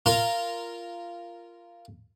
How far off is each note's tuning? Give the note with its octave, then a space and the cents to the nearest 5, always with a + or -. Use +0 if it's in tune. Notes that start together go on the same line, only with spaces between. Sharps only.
F4 -15 A#4 -5